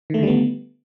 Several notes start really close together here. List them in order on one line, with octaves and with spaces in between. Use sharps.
D#3 A3 D3 G3 B3